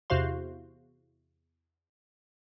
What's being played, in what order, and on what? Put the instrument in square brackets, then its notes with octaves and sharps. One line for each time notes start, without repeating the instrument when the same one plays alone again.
[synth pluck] E2 C3 F#4 C5 F5 C6